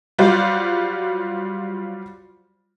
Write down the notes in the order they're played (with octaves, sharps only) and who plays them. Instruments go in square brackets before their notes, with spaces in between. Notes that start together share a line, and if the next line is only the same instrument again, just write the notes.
[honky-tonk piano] F#3 G3 F4 F#4 C5 D5